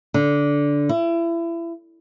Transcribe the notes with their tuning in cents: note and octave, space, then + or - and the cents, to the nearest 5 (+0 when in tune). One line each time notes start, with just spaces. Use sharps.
D3 -15
E4 +30